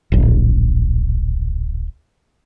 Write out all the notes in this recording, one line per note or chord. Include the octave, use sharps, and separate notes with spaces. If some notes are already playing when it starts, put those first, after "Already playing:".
D1 A#1